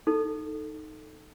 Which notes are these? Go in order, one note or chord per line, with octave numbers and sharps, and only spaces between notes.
D#4 A4